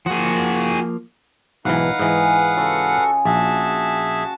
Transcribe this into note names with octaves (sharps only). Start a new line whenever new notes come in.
F3 A#3 F#4 G#4
B1 G#2 E3 D#4 B4 F5 F#5
G#2 E3 G#4 D#5
C#3 F4 F#4 A4 C#6
A#1 F#4 G#4 E5 A5